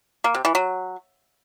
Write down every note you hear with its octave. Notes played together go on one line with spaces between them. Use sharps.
A#3
C3
E3
F#3